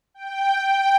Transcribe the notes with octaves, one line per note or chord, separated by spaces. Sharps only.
G5
G5